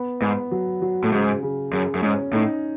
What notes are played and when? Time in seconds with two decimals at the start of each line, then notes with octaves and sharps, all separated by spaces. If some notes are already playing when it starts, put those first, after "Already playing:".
Already playing: B3
0.21 G#2 B3
0.51 F#3
0.82 F#3
1.04 A2
1.12 G#2 C#3
1.43 C#3
1.73 F#2 C#3
1.95 F#2
2.03 G#2 C#4
2.33 A2 D#4